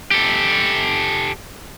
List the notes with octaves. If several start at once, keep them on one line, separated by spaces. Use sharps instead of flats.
G4 A4